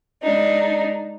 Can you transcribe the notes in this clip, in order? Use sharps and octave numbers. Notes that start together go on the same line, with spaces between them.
G#3 D4 D#4